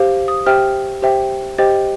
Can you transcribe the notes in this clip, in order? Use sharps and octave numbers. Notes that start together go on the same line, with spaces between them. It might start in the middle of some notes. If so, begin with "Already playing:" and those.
Already playing: G4 C5 F5
D#6
G4 C5 E5 G5 F6
G4 C5 E5 G5
G4 C5 D#5 G5 A6